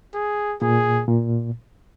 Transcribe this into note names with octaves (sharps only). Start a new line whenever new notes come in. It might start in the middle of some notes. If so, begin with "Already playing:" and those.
G#4
A#2 G#4
A#2